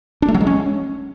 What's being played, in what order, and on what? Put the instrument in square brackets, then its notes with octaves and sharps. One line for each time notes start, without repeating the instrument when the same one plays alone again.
[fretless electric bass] D4
A3
F#3
G#3
C#4